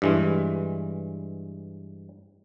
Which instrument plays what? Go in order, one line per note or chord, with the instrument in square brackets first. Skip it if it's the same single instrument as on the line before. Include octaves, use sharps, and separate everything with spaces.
[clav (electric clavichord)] G2 E3 G#3